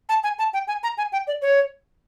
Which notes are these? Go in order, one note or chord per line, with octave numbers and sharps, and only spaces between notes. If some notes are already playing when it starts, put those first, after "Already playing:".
A5
G#5
A5
G5
G#5
A#5
G#5
G5
D5
C#5